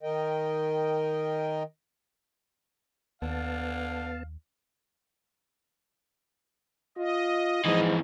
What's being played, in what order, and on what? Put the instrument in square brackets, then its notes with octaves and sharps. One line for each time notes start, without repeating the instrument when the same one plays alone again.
[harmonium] D#3 A#4 D#5 G5
[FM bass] D#2 [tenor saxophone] D3 [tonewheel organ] B3 A5 [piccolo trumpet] F5
[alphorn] F4 [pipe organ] D#5
[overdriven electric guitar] F2 E3 [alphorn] G#2